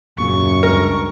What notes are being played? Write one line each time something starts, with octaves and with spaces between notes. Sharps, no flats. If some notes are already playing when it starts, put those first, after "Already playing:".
D#1 F#2 A#2 C#3 C#6
C#2 G2 A#4